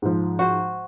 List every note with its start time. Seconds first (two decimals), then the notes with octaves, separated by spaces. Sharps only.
0.02 G#2 F3
0.39 F#4 C5